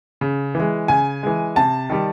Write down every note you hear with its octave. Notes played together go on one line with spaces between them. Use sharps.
C#3
E3
G#3
C#3 G#5
E3 G#3
C3 A5
D#3 G3